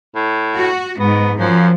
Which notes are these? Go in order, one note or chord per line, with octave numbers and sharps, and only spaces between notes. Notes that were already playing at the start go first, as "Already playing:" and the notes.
A2
F#4
G#2 B3
F#2 F3